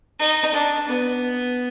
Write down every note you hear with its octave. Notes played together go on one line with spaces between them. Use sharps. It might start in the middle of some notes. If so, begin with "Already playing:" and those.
D#4
D4
B3